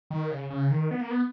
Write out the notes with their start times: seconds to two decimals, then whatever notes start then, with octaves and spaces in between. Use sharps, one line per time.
0.10 D#3
0.31 C#3
0.50 C#3
0.71 D#3
0.91 B3
1.01 A#3
1.11 B3